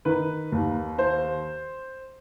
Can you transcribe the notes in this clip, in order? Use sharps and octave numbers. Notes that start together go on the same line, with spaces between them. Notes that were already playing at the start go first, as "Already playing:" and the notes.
D#3 B4
D#2
C5